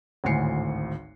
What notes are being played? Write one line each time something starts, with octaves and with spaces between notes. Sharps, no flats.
G#1 D2 A2 G#5 C7 C#7